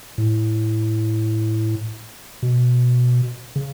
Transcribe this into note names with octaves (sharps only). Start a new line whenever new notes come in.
A2
B2
C#3